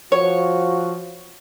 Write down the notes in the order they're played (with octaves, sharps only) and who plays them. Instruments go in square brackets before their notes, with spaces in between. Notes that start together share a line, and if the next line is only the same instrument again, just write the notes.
[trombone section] F3 F#4 [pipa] C#5